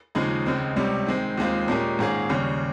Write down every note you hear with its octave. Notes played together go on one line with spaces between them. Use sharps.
D#2 C#3 F3 G#3 D#4
C#2 C#3 G#3 C4
C#2 C3 G3 C#4
D#3 G#3 C4
D#2 D#3 G#3 C4 F4
A#2 G#3 C#4 G4 A#4
G#2 D#3 A#3 C#4 G#4
D#2 C#3 G3 C#4